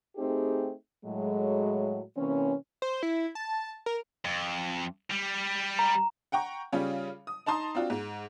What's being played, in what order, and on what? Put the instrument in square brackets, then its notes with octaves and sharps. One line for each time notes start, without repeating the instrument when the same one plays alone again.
[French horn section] A3 C4 D#4 G4 G#4
A2 F#3 G#3
C3 E3 A#3 C4 C#4
[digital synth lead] C5
E4
A5
A#4
[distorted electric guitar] F2
G3
[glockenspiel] A#5
[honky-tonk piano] F#5 G5 A#5 C#6
C#3 G3 C#4 F4
D#6
D#4 A5 A#5 C6 D#6
C4 D4 F4 F#4
G#2